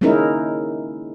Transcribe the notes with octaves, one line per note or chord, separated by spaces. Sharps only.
G#3 A#3 C#4 D#4 E4 A#4